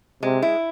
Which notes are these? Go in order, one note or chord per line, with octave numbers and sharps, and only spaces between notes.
C3 G#3
E4